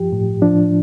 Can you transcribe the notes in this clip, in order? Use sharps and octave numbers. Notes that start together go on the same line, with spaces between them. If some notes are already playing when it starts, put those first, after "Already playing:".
Already playing: G2 F3 G4
A2
F3 D4